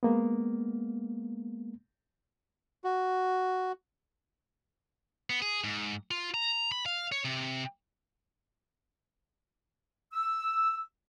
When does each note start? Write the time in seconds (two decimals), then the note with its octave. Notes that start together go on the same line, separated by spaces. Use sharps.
0.03 G#3 A#3 B3
2.84 F#4
5.30 B3
5.42 G#4
5.64 G#2
6.11 F4
6.34 A#5
6.72 B5
6.86 F5
7.12 C#5
7.25 C3
10.13 E6